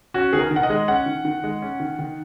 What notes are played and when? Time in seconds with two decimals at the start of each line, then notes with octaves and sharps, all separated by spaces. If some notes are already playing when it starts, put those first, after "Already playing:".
0.14 C#4 F#4
0.33 D#3 G#4
0.39 A#4
0.51 D#3
0.56 F#5
0.63 D#5
0.70 G#3
0.88 C#4 F#5
1.06 D#3
1.25 D#3
1.44 G#3
1.62 C#4
1.80 D#3
1.99 D#3